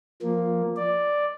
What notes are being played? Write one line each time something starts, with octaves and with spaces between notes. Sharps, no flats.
F3 A#3
D5